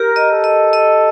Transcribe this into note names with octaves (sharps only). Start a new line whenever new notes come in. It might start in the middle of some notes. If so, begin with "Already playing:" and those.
Already playing: G4 A#4
D#5
A4
D#5
D#5